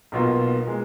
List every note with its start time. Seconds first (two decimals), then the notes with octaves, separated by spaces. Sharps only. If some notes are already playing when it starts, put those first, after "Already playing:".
0.12 B1 B2 A#3 F4
0.67 A#2 G#3